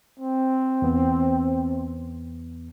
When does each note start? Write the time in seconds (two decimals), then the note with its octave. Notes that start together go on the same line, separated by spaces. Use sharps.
0.20 C4
0.82 E2 B3